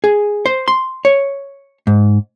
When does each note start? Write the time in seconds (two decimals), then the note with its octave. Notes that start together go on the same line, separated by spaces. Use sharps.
0.04 G#4
0.46 C5
0.68 C6
1.05 C#5
1.87 G#2